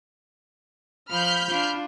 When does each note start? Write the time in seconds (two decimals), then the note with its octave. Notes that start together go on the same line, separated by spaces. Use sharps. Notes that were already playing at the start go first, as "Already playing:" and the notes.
1.11 F3 B5 F6 G6
1.49 D4 F4